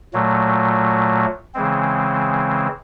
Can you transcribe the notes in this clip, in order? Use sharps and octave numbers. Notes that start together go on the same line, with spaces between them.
A#2 F#3 A3
C#3 E3 G#3 C4